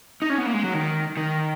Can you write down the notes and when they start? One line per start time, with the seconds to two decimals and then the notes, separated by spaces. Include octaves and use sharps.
0.22 D#4
0.30 C#4
0.38 B3
0.46 A#3
0.54 G#3
0.63 F#3
0.74 D#3
1.17 D#3